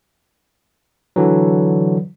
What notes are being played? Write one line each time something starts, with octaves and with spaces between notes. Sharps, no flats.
D3 E3 F#3